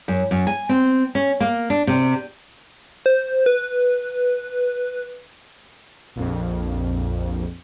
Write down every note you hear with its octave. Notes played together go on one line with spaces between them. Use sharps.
F#2
F#2
G#5
C4
C#4
A#3
D4
C3
C5
B4
A#1 F2